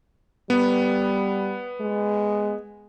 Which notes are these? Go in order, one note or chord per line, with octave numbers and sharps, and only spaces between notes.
G3 B3
G#3